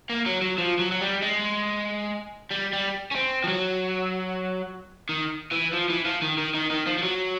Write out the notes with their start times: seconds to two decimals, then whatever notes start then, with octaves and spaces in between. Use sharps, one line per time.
0.10 A#3
0.26 F#3
0.42 F#3
0.58 F3
0.79 F#3
0.92 F#3
1.01 G3
1.22 G#3
2.51 G3
2.73 G3
3.11 C#4
3.16 C4
3.44 F3
3.48 F#3
5.09 D#3
5.52 E3
5.74 F3
5.90 E3
6.06 F3
6.22 D#3
6.38 D#3
6.54 D#3
6.70 D#3
6.87 F3
6.98 F3
7.03 F#3